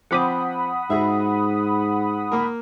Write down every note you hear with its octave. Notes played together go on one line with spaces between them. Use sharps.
F3 C4 F#5 B5 D6 D#6
G#2 F#4 G#4 E5
A#3 A#4